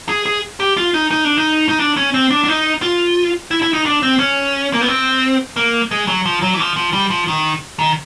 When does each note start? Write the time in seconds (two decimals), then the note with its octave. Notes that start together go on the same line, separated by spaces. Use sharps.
0.09 G#4
0.26 G#4
0.60 G4
0.77 F4
0.94 D#4
1.11 D#4
1.25 D4
1.38 D#4
1.69 D#4
1.80 D4
1.97 C#4
2.14 C4
2.31 D4
2.44 D4
2.48 D#4
2.82 F4
3.51 E4
3.62 E4
3.73 D#4
3.86 D4
4.03 C4
4.19 C#4
4.73 A#3
4.81 B3
4.88 C4
5.56 A#3
5.91 G#3
6.08 F#3
6.26 F3
6.42 F#3
6.54 E3
6.59 F3
6.76 F3
6.93 G3
7.10 F3
7.28 D#3
7.79 D#3